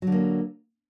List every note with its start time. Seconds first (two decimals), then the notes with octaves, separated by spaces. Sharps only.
0.02 F#3
0.07 D3
0.12 A#3